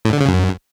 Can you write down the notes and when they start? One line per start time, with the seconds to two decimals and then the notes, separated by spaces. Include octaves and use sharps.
0.05 A2
0.13 D3
0.21 C#3
0.28 F#2